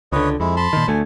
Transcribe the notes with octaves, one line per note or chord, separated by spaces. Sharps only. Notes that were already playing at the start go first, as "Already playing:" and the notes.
C#2 D3 B4 C#5 D#5
F2 G#3 E4
A5 B5 C6
A#2 D#3
D2 A3 G#5